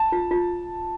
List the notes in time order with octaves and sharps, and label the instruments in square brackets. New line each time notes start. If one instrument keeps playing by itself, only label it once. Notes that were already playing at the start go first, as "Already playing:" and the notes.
Already playing: [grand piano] A5
[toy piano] F4
F4